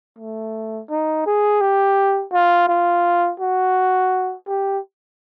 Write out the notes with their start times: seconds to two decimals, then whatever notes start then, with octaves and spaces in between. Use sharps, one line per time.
0.18 A3
0.90 D#4
1.26 G#4
1.61 G4
2.32 F4
2.68 F4
3.40 F#4
4.47 G4